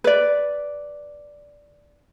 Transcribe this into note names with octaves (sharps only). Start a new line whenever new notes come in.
B4 D5